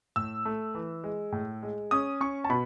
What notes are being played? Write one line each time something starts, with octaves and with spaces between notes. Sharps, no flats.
A2 E6
A3
E3
G#3
A2
G#3
C#4 D#6
C#4 C#6
A5
B2 B5